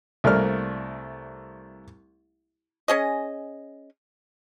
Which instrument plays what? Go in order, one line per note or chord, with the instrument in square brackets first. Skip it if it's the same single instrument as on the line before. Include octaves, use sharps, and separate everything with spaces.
[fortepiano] C2 A3 A#3 D5 F6
[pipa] C#4 G#4 D#5